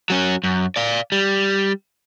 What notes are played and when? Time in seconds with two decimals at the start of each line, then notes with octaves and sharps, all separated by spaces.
0.10 F#3 C#4
0.44 F#2
0.76 D5 F5
1.12 G3